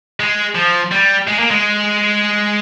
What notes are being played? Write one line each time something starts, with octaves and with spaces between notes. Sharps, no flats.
G#3
F3
G3
G#3
A#3
G#3